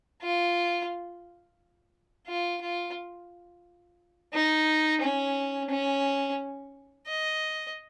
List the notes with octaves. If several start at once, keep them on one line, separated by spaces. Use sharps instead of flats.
F4
F4
F4
D#4
C#4
C#4
D#5